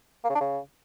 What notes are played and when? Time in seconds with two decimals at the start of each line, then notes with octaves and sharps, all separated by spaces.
0.24 A#3
0.29 C#3
0.35 D4
0.40 C#3